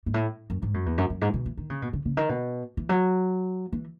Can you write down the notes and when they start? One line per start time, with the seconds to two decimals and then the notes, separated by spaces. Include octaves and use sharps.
0.06 G#2
0.14 A2
0.50 F#2
0.62 G#2
0.74 F#2
0.86 E2
0.98 F#2
1.10 F#2
1.21 G#2
1.34 B2
1.46 E3
1.57 D#3
1.70 C#3
1.82 B2
1.93 C#3
2.05 C#3
2.17 D#3
2.29 B2
2.77 E3
2.89 F#3
3.73 E3